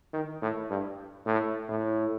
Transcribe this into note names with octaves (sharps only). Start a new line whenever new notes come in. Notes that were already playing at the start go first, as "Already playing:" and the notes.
D#3
A2
G2
A2
A2